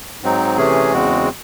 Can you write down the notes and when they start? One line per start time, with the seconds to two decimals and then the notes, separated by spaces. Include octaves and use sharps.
0.23 G#2 F#3 C4 D#4
0.57 C3 E3 A3 C#4 G#4
0.93 E2 C#3 G#3 C4 F#4